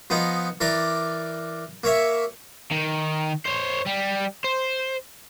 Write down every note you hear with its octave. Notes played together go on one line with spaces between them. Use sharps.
F3 B3 D#4
E3 A#4 D5
A#3 C#5 E5
D#3
C5 C#5
G3
C5